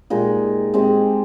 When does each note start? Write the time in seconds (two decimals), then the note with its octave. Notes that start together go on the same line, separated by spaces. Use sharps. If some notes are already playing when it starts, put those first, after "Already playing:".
0.10 A#2 G#3 D#4 G4
0.74 G#3 C4 G4